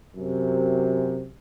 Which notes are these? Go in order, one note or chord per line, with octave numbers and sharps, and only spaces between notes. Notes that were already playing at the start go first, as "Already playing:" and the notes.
F#2 C3